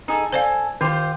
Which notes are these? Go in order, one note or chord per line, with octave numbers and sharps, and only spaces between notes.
D#4 G#4 A4
A4 C5 D5 F5 G#5
D#3 F4 G4 C5 G5